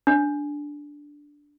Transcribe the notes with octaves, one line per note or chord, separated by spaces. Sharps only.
D4